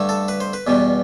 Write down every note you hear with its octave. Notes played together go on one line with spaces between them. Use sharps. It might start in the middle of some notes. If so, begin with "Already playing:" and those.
Already playing: G2 D3 A3
A4
B4
C5
B4
E2 B2 G3